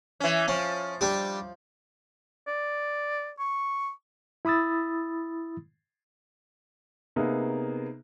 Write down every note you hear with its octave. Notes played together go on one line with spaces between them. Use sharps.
E3 C#4
F3 C#4
G3 D4 G4
D5
C#6
E4 B5 D#6 E6 A6
C3 A#3 B3 D#4 G#4